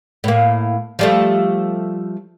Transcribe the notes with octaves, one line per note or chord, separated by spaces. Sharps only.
A2 A#3
F3 G3 A3